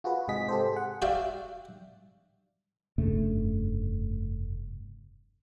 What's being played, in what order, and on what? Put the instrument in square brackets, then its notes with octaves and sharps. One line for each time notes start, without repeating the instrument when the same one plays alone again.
[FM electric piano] F4 F#4 G#4 B4
G#2 C3 G#4 D#5 B6
G4 A4 C5
G#4 F#5
[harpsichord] F#4 G4 D5 E5 F5 G5
[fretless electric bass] F1 G2 C#3 A3